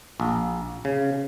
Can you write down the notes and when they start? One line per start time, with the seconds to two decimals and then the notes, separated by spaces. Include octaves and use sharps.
0.20 A#1
0.85 C#3